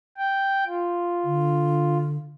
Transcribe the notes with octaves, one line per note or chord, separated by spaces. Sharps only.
G5
F4
D3